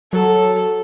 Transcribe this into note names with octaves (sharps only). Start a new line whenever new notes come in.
F#3 A4